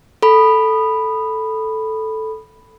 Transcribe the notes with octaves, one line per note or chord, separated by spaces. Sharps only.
A4 B5